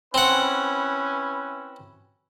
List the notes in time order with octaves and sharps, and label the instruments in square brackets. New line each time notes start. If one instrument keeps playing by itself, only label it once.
[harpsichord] C4 F#5 [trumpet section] C#4 E4 B4